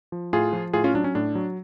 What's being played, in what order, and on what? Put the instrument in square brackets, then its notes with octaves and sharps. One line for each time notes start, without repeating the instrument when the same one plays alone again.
[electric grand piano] F3
A2 F4 G#4
F3
A2 F4 G#4
C#4 F4
F#3 D4
C#4
A2 D4
F#3